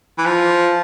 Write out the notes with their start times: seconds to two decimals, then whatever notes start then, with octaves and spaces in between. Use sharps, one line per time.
0.18 E3
0.25 F3